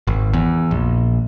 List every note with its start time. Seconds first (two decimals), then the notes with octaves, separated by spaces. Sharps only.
0.07 G#1
0.33 E2
0.71 A#1